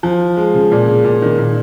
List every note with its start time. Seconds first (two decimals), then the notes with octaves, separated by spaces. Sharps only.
0.03 F3
0.37 G#3
0.54 C#3
0.72 A#2
0.88 C#3
1.04 A#2
1.22 D#3
1.39 A#2